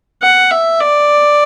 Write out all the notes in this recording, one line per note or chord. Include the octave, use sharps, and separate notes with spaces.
F#5
E5
D5